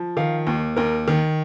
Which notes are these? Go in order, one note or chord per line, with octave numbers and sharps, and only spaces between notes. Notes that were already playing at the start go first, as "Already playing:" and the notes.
Already playing: F3
D#3 F5
D#2
D#2 A#4
D#3